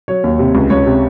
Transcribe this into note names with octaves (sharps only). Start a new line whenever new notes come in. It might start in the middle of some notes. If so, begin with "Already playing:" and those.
F#3 C#5
D#2
C3
C#2
C#2 C#5
C3